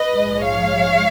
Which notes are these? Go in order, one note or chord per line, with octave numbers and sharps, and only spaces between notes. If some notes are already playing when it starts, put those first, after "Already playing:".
Already playing: B4 D#5
A#1 G#2 F3 G#3
C#5 F5